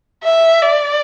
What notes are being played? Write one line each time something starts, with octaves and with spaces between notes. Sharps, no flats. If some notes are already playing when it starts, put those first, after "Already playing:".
E5
D5